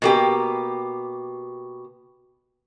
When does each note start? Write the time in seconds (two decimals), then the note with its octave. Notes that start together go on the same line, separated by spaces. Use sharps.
0.02 B2 A#3 G4